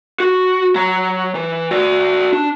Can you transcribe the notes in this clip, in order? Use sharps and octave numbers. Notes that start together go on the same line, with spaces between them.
F#4
F#3 A#5
E3
F#4 D5
D4